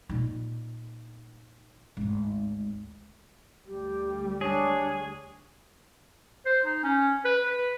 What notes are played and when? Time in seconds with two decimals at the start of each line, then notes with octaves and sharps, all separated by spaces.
0.09 A#2 D#4
1.97 G#1 D2
3.66 D2 G3 G4
4.41 D4 G#4 C#5
6.46 C5
6.65 D#4
6.83 C#4
7.25 B4
7.45 B4